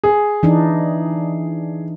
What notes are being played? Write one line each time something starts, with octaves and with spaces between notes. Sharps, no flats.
G#4
E3 D4 D#4